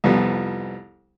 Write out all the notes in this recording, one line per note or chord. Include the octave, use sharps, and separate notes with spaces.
C2 F2 F3 G3 B3